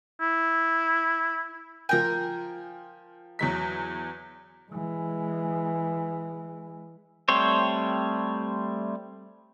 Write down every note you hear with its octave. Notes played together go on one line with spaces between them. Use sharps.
E4
F3 A#4 G5 G#5
E2 F#3 B6
E3 G#3
G3 A3 C4 C5 C#5